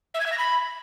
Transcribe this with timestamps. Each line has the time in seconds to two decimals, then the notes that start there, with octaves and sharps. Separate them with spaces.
0.14 E5
0.20 G#6
0.26 E5
0.32 A#6
0.38 B5